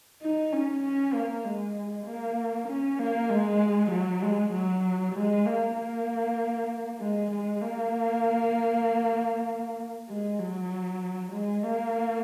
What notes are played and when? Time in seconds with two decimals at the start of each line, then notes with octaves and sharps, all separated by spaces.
0.22 D#4
0.52 C#4
0.83 C#4
1.14 A#3
1.44 G#3
2.06 A#3
2.68 C#4
2.99 A#3
3.30 G#3
3.91 F#3
4.22 G#3
4.53 F#3
5.15 G#3
5.46 A#3
5.77 A#3
7.00 G#3
7.31 G#3
7.62 A#3
10.09 G#3
10.39 F#3
11.32 G#3
11.63 A#3